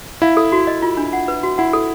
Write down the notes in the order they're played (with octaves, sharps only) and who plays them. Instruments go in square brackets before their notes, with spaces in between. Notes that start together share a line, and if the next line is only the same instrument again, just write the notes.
[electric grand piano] E4 [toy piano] F5
[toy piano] A4
F#4
D#5
F4
D4
F#5
B4
F#4
[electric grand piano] E4 [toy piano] F#5
[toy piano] A4